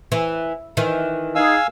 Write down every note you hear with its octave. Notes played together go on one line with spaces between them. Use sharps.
E3
D#3 E3
D#4 G#4 F5 G#5 E6